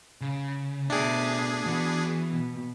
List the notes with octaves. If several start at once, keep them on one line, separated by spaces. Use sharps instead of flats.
C#3
B2 A3 D4 G#4 E5 G5
E3 B3 F#4
B2